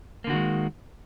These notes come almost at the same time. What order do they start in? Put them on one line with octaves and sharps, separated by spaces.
A#3 D3 F#4 D#3 G#3